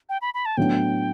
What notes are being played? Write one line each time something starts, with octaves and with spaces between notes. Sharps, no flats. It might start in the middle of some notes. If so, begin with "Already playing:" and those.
G5
B5
B5
A5
A2 F#3 B3 D4 G5